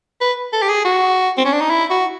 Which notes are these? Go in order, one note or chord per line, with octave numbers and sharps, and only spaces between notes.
B4
A4
G4
G#4
F#4
C4
C#4
D4
D#4
E4
F#4